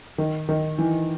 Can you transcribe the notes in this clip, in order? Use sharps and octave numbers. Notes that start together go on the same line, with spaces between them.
D#3
D#3
E3